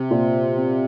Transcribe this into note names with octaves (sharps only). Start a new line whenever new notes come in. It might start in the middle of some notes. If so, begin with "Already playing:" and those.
Already playing: C3
A#2
C4